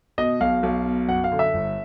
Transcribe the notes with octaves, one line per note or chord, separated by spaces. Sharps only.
B2 D#5
B1 F5
B1
B2
F#2 F#5
F5
D3
E5
G1